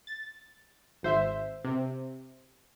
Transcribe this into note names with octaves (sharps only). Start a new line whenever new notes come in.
A6
G#1 C5 E5
C3